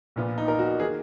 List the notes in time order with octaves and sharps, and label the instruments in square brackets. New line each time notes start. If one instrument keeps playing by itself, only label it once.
[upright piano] A#1 A#2 F3 B3 F4
[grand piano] D#4
A#4
F#4
[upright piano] D#3 A#3 [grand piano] G#4